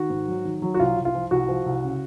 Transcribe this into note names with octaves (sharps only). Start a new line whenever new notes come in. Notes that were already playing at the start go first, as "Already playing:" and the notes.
Already playing: D#3 F#4
G#2
F#3
D#3
F#3
F#4
C2 F4
C2
F4
F3
C2 F#4
F3
C2
C#3